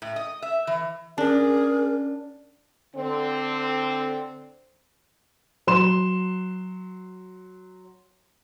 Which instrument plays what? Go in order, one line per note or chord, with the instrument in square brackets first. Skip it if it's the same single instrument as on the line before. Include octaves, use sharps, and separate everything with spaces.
[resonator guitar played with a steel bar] A2
D#5
E5
E3
[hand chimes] C#4 A5 [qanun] D4 [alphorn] G#4 [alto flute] A#4
[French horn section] D3 C4
[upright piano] F#3 C6 E7